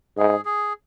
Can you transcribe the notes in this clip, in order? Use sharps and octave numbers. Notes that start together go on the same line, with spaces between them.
G#2 G#4
G#4